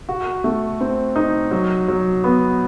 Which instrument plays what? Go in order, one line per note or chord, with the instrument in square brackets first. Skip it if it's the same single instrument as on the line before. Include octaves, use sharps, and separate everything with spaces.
[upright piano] F#4
A3
C4
D#4
F#3
F#3
B3